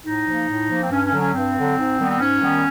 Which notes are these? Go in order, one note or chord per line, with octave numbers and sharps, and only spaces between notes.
A2 D#4
F3 A#3
A2
F3 A#3
C4
G2 C#4
C#4
D3 F#3
C#4
G2 C4
D3 F#3
G#2
D#3 G3 B3
C4
G#2 C#4
D#3 G3 B3